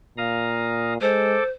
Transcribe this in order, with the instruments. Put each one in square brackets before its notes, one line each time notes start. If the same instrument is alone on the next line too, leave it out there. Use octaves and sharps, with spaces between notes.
[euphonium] A#2 [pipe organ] F5 A#5 D#6
[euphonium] G#3 [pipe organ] A4 D6 [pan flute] C5